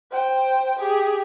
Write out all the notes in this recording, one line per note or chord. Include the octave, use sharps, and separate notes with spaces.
C5 G5
G4 G#4